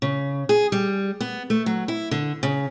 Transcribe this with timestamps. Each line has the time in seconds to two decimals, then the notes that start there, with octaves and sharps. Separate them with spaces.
0.02 C#3
0.49 G#4
0.72 G3
1.20 B3
1.50 A3
1.66 F#3
1.88 E4
2.11 D3
2.43 C#3